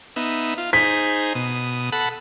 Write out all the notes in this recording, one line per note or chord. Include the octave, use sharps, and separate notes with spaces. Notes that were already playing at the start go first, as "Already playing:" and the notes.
B3 D#4 E5
F4
D#4 G#4 C5 B6
B2 D#6
A4 F#5 B5